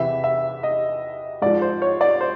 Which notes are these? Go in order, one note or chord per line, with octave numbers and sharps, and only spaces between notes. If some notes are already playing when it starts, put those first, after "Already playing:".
Already playing: E2 C3 E3 E5
E5
D#5
G#2 F3 D5
C5
C#5
D5
C5